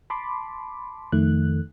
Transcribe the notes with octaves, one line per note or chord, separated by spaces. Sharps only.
A5 B5 C6 D6
F2 D#3 A3 F#6